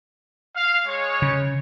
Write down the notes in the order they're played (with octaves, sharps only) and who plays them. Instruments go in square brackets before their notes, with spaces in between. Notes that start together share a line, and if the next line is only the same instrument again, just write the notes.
[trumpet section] F5
G#3 C#5
[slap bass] C#3